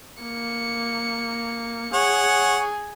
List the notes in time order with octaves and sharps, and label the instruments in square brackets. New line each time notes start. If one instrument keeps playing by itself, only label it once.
[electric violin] A#3 C#7
[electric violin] G#4 [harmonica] C#5 F#5